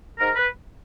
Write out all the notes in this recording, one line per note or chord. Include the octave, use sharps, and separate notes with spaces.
G#2 A#4
B4